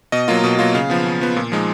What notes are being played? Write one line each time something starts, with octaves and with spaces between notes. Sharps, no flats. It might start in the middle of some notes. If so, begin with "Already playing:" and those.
B2 D#5
F#3 A#3 F4
B2
F#3 A#3 F4
C#3 F5
F3 B3
C#3
F3 B3
A#2
F3 G#3 D#4